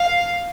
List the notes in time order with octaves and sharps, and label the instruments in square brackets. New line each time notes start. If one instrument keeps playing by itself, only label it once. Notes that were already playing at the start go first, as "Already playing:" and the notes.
Already playing: [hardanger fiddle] F5